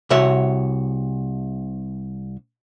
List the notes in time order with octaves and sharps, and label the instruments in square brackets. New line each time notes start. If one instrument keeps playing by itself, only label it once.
[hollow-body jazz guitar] C2 C3 F#4 C#5 E5